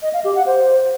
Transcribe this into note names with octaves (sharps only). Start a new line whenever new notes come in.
D#5
F5
G4
F#5
C5